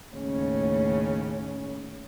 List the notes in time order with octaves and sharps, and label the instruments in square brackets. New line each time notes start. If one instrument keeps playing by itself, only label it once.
[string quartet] D#2 A2 C#3 C#4